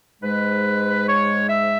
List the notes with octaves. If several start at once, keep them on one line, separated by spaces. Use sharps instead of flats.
G#2 G#3 B4
C#5
E5